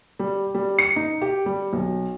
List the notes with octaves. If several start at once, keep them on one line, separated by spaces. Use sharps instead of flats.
G3
G3
C#7
D#4
G4
G3
B1